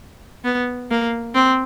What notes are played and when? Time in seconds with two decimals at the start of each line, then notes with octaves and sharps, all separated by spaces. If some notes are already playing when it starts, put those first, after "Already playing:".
0.45 B3
0.91 A#3
1.35 C4